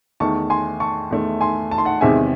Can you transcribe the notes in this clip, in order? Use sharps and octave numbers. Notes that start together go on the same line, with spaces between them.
E2 D#3 A3 A5 C#6
G#5 C6
A5 C#6
E2 D#3 A3
G#5 C6
A5
C6
F#5 A5
E2 C3 D#3 G#3 C4 E5 G#5